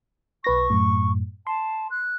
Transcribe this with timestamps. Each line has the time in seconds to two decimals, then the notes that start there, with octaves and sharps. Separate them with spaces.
0.44 B1 B4 C#6 A#6
0.70 F#2 A2
1.47 A5 C6
1.91 F#6